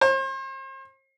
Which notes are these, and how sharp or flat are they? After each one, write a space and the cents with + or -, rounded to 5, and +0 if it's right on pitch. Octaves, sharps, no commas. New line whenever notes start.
C5 +40